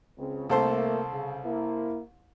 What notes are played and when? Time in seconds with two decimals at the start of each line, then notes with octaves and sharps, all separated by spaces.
0.18 C#2 C#3 C4
0.49 C2 A3 A#3 A4 C5
1.11 C#3
1.45 A#3 E4